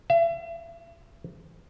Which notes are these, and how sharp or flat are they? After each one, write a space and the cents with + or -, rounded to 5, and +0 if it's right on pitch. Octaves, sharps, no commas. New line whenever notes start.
E5 +40